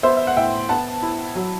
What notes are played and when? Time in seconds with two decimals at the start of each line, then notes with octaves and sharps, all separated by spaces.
0.03 B3 C5 E5
0.17 E5
0.27 F#5
0.37 A2 E5 G5
0.69 B3 F#5 A5
1.03 E4
1.35 F#3